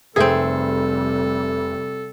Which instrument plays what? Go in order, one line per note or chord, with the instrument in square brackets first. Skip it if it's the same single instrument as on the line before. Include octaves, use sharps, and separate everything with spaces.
[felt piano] F1 E5 [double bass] C3 G3 [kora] C4 G#4 [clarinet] A4